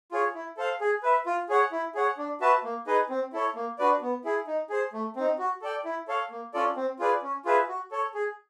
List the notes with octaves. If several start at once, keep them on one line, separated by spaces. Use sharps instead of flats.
F4 G#4 C#5
E4
A4 C5 F5
G#4
B4 E5
F4
G#4 C#5 F#5
E4
G#4 C#5 F#5
D4
F#4 B4 E5 A5
A#3
D#4 G#4 B4 D#5
C4
E4 A4 C#5
A#3
D4 F#4 B4 D5
B3
E4 G#4
D#4
G#4 C5
A3
C4 D#4
F#4
A4 D5 G5
E4
A4 C#5 F5
A#3
C#4 F4 A4 D5
C4
F4 G#4 B4 D5
C#4
F4 G#4 B4 E5
F#4
A4 C#5
G#4